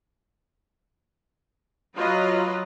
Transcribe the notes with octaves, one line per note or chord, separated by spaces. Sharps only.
F#3 F4 B4 D#5